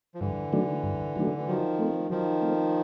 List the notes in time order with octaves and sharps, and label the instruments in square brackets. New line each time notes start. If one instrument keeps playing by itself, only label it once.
[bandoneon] F3
[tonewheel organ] G2 [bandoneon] D3 E3
[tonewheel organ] D#3 F#3 A3 D4
G2
D#3 F#3 A3 D4
[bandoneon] E3
[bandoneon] D#3 F3 [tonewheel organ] F#3
[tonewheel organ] A3 C4
[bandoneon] D#3 F3 [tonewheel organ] F#3
[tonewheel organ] A3 C4